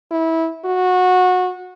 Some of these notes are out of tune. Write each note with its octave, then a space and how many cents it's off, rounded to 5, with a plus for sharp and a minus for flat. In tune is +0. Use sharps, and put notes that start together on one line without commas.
E4 -20
F#4 -20